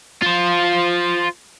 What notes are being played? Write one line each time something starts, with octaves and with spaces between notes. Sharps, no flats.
F4 C5